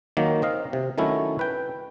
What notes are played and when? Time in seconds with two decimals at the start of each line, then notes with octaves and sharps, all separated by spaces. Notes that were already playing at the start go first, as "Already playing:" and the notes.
0.17 D#3 F#3 A#3
0.42 C4 D#5 F5
0.73 C3
0.98 D#3 F#3 A3 C#4 E4
1.39 B4 G5